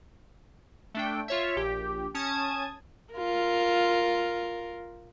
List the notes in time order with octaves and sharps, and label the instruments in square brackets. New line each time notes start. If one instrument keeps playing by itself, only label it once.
[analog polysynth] A3 D4 G5
F4 C#5 E5
A#1 G4
C#4 A5 D#6 G#6
[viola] F4 A#4